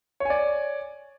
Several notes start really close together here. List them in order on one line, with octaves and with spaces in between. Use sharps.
C#5 G#5 D5